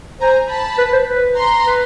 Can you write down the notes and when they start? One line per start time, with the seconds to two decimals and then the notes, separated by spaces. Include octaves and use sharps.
0.20 C5 G#5 A#5
0.49 A5 B5
0.78 B4
0.93 C5
1.07 B4
1.36 A#5 C6
1.66 B4